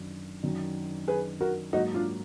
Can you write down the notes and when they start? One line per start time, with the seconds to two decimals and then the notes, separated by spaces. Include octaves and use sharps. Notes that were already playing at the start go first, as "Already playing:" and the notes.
Already playing: F#2 D#3 F#3 D4
0.43 F#2 D#3 F#3 D4 F#4
1.08 G#4 B4
1.41 F#4 A#4
1.73 G#2 F#3 A#3 D#4 F#4
1.94 D4 F4